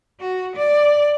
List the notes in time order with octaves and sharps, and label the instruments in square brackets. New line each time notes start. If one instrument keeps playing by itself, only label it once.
[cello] F#4
D5